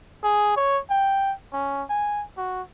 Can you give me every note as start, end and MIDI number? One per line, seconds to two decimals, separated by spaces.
0.23 0.53 68
0.57 0.79 73
0.90 1.33 79
1.53 1.83 61
1.90 2.24 80
2.38 2.62 66